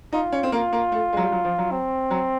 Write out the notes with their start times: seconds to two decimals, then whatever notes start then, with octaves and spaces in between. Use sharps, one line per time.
0.13 D#4 F4
0.32 C#4
0.43 C4
0.52 A#3 F4
0.73 A#3
0.92 A3
1.13 G#3
1.17 F#3
1.22 G3
1.32 F#3
1.44 F3
1.58 F#3
1.71 C4
2.11 F#3